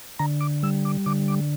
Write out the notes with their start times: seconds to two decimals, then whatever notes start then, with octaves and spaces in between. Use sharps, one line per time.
0.19 D3 A#5
0.41 D6
0.63 G3 E6
0.85 D6
1.06 D3 D6
1.28 D6